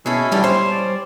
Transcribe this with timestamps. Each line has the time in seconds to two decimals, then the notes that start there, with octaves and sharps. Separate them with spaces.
0.06 B2 C#4 E4 G#4 A4
0.32 D3 E3 G3 G4 A5
0.44 C5 C#5
0.71 D5